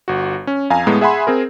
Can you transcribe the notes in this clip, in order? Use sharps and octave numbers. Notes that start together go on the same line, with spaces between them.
G1 F#4
C#4
F2 F5 G#5 A#5
A2 G#3 B3
G#4 E5 F#5 G#5 B5 C6
C4 G#4 A#4